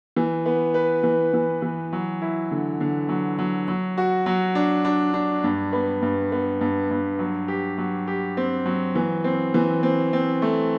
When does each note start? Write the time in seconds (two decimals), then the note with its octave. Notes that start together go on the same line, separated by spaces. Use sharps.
0.16 E3
0.46 B3
0.74 B4
1.04 E3
1.33 E3
1.62 E3
1.93 F#3
2.22 E4
2.51 D3
2.80 D3
3.09 F#3
3.39 F#3
3.68 F#3
3.98 F#4
4.26 F#3
4.55 D4
4.85 D4
5.14 D4
5.44 G2
5.73 B3
6.02 G2
6.32 B3
6.61 G2
6.91 G2
7.19 F#3
7.48 G4
7.78 F#3
8.07 G4
8.37 C4
8.66 F#3
8.95 E3
9.24 C4
9.54 E3
9.83 C4
10.13 C4
10.42 A3